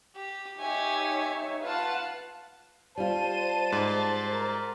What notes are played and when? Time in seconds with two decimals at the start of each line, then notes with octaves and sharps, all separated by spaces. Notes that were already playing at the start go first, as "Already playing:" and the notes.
0.15 G4
0.59 D#4 G4 C#5 E5 G#5
1.63 F4 B4 F5 F#5 A5
2.98 G3 F4 C5 A5 D#7
3.72 G#2 C5 A6
4.32 A#4